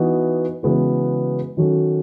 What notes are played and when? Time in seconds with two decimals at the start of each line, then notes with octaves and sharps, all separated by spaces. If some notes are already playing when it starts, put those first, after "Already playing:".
Already playing: E3 B3 D#4 F#4
0.63 C#3 E3 G#3 B3 F#4
1.57 D#3 F#3 C#4 F#4 A4